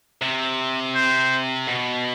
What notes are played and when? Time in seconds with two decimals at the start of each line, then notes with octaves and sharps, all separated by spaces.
0.21 C3
0.95 C5
1.67 B2